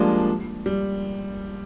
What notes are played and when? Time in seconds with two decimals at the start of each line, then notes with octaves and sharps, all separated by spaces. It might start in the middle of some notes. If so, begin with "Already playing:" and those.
Already playing: F3 G3 G#3 A#3 D4 F4 G4
0.66 G3